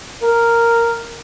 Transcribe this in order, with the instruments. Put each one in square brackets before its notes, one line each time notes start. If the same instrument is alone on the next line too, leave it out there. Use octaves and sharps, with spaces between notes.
[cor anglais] A#4